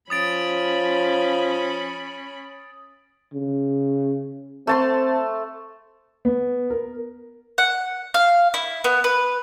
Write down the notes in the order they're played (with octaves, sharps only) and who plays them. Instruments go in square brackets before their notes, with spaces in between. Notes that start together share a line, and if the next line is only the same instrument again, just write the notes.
[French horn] F3 [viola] C#4 B5 [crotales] D#6 A6 D7
[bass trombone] C#3
[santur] A3 A5 C6 [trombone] C4
[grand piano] B3
A#4
[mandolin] F#5
F5
E4
B3
B4